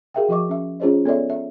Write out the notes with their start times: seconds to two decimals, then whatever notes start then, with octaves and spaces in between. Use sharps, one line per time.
0.14 F#4 G#4 A#4 E5 F5 G5
0.29 F3 F#4 D#5 C#6 D6
0.49 C#4 E5
0.80 C#4 F4 G#4 C5 C#5 D#5
1.05 B3 A4 C#5 D5 E5
1.29 A4 E5